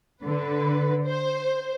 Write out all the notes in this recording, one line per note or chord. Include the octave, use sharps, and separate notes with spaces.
D3 B4
C5